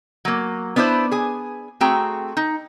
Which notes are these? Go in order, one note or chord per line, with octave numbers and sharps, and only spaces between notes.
F#3 A#3
B3 D4 E4 B4 C5
G#4 G#5
A3 C4 F#4 G#4 G5 A#5
D#4